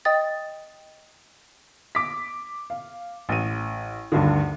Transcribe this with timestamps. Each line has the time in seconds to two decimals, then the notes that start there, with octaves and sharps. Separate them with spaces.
0.05 D#5 G5 D#6 A6
1.95 D6 B6
2.70 F5
3.29 A1 D#7
4.12 D2 G2 D3 D#3